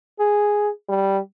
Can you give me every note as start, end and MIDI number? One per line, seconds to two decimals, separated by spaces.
0.19 0.69 68
0.89 1.19 55